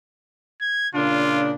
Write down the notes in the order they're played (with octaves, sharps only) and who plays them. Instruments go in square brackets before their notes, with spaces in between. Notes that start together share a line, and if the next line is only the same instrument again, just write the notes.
[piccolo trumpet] G#6
[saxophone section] A#2 C#3 D4 [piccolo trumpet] F4